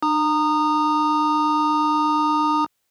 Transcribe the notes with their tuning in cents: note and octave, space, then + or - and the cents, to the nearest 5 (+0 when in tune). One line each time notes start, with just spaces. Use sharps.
D4 +45 A#5 -15 D#6 -20